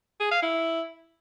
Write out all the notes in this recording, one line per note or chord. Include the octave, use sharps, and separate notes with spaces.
G#4
F5
E4